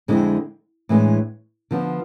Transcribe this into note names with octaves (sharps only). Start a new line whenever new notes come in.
F2 D3 G#3 C4 E4
A2 E3 G#3 D4
D3 F3 B3 D4